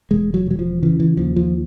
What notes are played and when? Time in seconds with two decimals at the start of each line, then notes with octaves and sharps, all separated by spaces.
0.11 E1 G#3
0.34 F#3
0.46 E1 F#3
0.59 F3
0.83 C#3 E3
1.00 E3
1.17 D#2 F3
1.36 F3